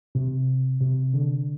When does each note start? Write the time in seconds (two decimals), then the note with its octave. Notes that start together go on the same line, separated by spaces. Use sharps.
0.15 C3
0.81 C3
1.13 D3